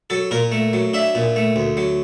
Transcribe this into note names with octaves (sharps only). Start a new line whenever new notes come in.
F#3 A4
A#2 A#4
A3
F#3
D4 E5
A#2
A3
D2
F#3